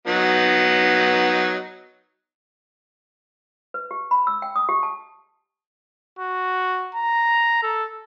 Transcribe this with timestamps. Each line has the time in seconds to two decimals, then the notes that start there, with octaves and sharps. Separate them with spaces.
0.07 F#3 B3 D#4
3.74 B4
3.91 G4
4.11 B5
4.27 E6
4.42 G5
4.56 D#6
4.69 G4
4.83 A5
6.19 F#4
6.95 A#5
7.63 A4